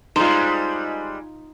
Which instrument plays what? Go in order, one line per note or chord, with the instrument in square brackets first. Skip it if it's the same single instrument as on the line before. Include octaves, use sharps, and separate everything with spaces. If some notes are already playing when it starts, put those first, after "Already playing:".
[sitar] G3 G#3 [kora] D#4 F4 [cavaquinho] C5